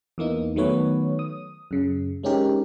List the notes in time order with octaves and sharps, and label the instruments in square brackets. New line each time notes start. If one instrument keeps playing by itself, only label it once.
[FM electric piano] E2 E3 A#3 D#4
D#3 F#3 A3 B3 B4 C#5
D#6
F#2 C#3
G#3 C4 C#4 D#4 G4 A#4